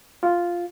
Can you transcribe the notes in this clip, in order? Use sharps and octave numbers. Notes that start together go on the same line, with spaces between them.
F4